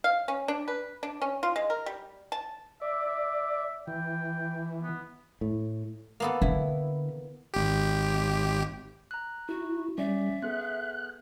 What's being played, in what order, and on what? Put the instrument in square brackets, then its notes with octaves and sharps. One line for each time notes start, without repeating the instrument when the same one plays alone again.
[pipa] F5
C#4
D4
B4
D4
C#4
F4
G#3
A#4
G3
A5
[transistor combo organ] D5 [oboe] E5
[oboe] E5
[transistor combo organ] E3 [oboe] G5
[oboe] B3
[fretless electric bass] A2
[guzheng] A#3 B3 A4
[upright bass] D3 [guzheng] E4
[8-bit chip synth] G#1 G4
[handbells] A#5 F#6
[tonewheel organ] E4 [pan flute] F#4
[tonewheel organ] G3 [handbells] C#4 D5 [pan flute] E5
[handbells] B3 G#4 A4 [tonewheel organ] F#6